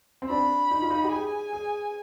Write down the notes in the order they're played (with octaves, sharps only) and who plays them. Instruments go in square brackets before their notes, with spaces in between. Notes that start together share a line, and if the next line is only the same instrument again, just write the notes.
[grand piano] C4
[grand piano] D4 [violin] B5
[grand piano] D#4
F4
D#4
G4
[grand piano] G#4 [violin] G#5
[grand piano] G#4